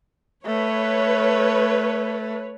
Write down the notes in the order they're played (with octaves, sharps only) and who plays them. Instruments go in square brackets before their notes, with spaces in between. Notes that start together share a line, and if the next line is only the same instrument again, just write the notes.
[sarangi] A3 [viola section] B4 C#5